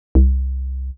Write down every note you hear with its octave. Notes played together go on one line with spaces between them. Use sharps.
C2